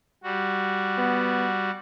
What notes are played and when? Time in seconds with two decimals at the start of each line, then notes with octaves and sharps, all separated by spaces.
0.23 G3 F#4
0.98 B3